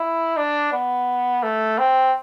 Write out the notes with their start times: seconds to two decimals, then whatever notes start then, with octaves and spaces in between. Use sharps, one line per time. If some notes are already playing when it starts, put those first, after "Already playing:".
Already playing: E4
0.37 D4
0.73 B3
1.43 A3
1.78 C4